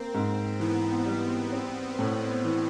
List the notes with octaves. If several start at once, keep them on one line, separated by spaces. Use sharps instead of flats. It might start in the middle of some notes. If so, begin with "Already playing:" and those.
Already playing: A#3 C4
G#2
E3 B3
G3
C4
A2
E3